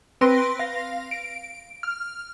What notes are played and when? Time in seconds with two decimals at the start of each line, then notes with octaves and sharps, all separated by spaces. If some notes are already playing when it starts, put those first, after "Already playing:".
0.21 C4 B4 C6 A#6 D7
0.59 F5 A#6
1.11 D7
1.83 F6